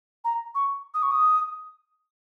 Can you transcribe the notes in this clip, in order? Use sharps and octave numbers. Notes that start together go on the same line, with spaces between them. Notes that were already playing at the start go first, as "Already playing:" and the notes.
A#5
C#6
D#6
C#6
D#6